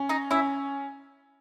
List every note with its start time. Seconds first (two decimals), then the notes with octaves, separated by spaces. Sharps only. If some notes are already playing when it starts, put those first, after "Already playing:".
Already playing: C#4
0.09 D#4 D#5
0.30 C#4 E4 E5